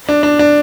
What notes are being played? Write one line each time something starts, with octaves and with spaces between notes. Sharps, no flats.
D4
D4
D4